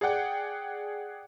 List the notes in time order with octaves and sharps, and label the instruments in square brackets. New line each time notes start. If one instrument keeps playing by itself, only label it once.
[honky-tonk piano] G#4 D5 F#5 G5